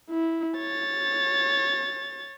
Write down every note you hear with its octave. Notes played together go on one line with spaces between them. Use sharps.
E4
C#5 A6